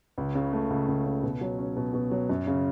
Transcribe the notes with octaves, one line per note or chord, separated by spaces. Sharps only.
C#2
C#3
A3
C#2
C#2
C#3
B2
F#3
C#4
B2
B2
F#3
F#2
C#3